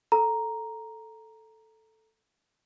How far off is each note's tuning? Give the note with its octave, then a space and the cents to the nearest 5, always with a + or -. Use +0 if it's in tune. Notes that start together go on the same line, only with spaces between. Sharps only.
A4 +0 A#5 +0